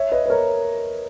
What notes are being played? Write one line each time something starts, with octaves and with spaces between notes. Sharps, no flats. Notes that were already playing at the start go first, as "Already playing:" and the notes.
Already playing: C#5 E5
B4 D#5
B4
A#4 C#5